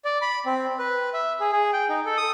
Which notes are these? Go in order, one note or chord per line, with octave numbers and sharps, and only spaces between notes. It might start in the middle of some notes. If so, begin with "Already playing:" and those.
D5
B5
C4
B4
E5
G#4
G#4
G5
D#4
A4
D#6